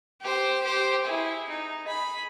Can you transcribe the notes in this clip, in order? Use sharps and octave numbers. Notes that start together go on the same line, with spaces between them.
G4 C5
G4 C5
E4 G#4
D#4
G#4 B5